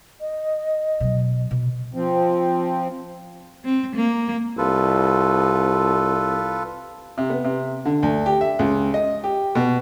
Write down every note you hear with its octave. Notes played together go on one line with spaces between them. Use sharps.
D#5
B2 F#3
B2
F3 C4
C4
A#3
C2 F4 A4 B4
C3
B3
C3
D3
D2
G4
E5
C#2
D#5
G4
B2